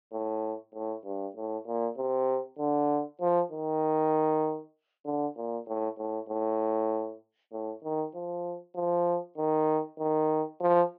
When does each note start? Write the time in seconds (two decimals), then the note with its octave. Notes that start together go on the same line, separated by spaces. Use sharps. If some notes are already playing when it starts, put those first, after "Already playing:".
0.12 A2
0.74 A2
1.05 G2
1.36 A2
1.66 A#2
1.97 C3
2.59 D3
3.20 F3
3.52 D#3
5.05 D3
5.36 A#2
5.67 A2
5.98 A2
6.29 A2
7.52 A2
7.84 D#3
8.14 F3
8.75 F3
9.37 D#3
9.99 D#3
10.60 F3